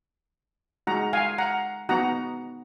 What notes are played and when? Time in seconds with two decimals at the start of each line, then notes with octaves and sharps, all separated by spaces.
0.87 G#3 D#4 F#4 F#5 A#5
1.13 F5 G#5
1.38 F#5 A#5
1.89 B3 D#4 F#4 F#5 A#5